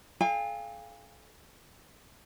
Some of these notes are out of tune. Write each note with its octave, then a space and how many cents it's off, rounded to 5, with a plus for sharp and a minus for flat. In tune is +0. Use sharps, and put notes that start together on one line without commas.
A4 -40 F5 +0 G#5 -45